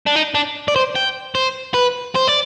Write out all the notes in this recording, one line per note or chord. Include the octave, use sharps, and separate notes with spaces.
D4
D#4
D4
D5
C5
G5
C5
B4
C5
D5